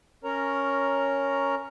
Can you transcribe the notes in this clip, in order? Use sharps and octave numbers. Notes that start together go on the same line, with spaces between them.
C#4 A#4 C#5 A#5